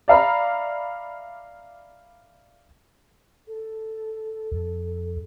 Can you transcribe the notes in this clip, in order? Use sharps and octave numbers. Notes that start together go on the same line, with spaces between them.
D5 E5 F5 A#5 B5
A4
F2